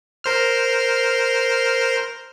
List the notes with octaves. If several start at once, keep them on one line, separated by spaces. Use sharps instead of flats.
A#4 C5 F6